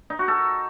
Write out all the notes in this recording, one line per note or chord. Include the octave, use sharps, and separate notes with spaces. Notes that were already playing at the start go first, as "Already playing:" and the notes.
D#4
F#4
A4